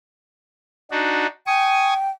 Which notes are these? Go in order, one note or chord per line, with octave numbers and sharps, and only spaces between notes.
D4 D#4 F#4
G5 G#5 C#6 D#6